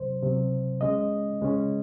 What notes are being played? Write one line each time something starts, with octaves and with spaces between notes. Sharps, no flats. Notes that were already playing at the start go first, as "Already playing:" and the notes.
Already playing: C#2 C3 F#3 C5
C#2 C3 F#3
C#2 C#3 G#3 C#4 D#5
C#2 C#3 G#3 C#4